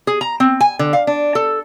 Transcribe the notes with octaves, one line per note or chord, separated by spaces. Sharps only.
G#4
A#5
C4
G#5
D3
F5
D4
A4